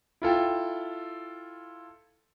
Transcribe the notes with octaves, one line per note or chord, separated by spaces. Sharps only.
E4 F4 A4 G5